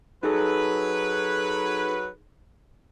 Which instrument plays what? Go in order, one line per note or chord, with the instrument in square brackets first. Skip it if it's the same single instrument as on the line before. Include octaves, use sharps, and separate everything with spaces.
[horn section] F#3 B4 [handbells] D#4 G#4 A4